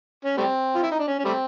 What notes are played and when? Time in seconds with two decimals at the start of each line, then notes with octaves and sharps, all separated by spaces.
0.25 C#4
0.37 G3 A3 C4
0.75 F4
0.83 E4
0.91 D#4
0.99 D4
1.07 C#4
1.19 C#4
1.25 G3 A3 C4